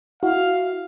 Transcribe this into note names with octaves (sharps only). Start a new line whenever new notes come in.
E4 F#4 F5